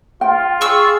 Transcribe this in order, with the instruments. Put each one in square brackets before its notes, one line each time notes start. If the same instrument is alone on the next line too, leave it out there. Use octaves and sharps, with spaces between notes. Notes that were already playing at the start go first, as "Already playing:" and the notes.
[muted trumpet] F4 [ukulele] G5
[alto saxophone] G#4 [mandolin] C#6 E6